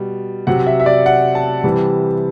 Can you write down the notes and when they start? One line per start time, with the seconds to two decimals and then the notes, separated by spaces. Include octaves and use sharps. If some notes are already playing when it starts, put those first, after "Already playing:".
Already playing: B2 G3
0.47 C3 F#3 F#5
0.67 E5
0.80 E5
0.86 D5
1.06 F#5
1.35 A5
1.64 C3 E3 G3